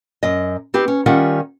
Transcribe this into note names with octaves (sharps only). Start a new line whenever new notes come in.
F#2 D#5
C4 D#4 G4 B4
C#4
D#3 G3 C#4 F4 E5 F#5